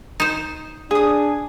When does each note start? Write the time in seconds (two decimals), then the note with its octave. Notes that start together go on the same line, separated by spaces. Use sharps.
0.20 D#4 C5
0.91 D4 G#4 D#6